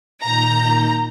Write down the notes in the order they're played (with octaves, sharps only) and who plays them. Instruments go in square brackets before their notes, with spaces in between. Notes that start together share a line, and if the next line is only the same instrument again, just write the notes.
[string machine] A#2 D#3 G6 [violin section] A#5